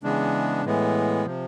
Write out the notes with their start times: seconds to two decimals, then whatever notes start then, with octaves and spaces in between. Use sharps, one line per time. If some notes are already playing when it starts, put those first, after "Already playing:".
0.03 C#3 E3 G#3 B3 D4
0.64 A2 E3 G#3 B3
1.25 C3 F3